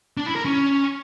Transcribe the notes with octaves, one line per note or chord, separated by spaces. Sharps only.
D4
E4
A#4
C#4